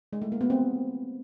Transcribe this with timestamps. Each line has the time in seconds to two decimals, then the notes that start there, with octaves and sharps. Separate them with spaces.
0.13 G#3
0.22 A3
0.32 A#3
0.41 B3
0.50 C4